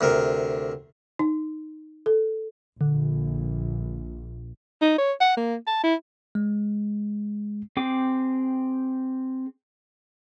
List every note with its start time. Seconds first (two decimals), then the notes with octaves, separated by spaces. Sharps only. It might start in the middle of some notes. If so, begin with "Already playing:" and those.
0.01 D2 C3 A#4
1.19 D#4
2.06 A4
2.81 A#1 D3
4.81 D#4
4.98 C#5
5.20 F#5
5.37 A#3
5.67 A5
5.84 E4
6.35 G#3
7.77 C4 G#4 G5 D6